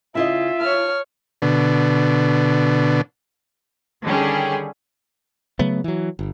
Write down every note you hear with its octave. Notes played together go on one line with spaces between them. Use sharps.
C#3 E4 F4 D#5 E5
C#5 A5 F6
B2 D3
D3 D#3 G3 C#4 G4 G#4
C#3 F#3 A3 B3
E3 F#3
G1